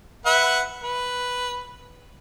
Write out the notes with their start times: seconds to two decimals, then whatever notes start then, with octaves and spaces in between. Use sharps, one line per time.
0.26 B4 E5 F#5
0.83 B4